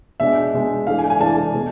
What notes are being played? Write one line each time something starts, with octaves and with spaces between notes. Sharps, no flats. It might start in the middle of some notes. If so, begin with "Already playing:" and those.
B2 G#3 D4 E5
B2 G#3 D4
E3 A3 D4 F5
G#5
G#5
E3 A3 D4 A5
B2 A3